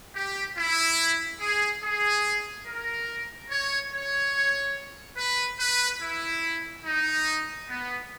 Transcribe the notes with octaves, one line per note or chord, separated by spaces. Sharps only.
G4
E4
G#4
G#4
A#4
C#5
C#5
B4
B4
E4
D#4
B3